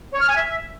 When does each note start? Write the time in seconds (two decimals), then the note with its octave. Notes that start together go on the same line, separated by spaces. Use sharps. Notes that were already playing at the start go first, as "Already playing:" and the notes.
0.13 C#5
0.21 F6
0.28 G#5
0.36 E5